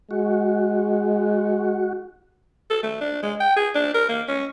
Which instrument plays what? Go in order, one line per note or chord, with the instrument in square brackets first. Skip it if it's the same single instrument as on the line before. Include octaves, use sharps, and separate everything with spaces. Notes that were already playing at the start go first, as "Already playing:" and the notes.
[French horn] G#3 [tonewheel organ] F#4
[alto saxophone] A4
A3
D4
G#3
G5
G#4
D4
A#4
A#3
C#4